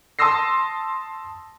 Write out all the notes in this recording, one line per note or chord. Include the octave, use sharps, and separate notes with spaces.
A5 C6 D#6 E6 A#6 C7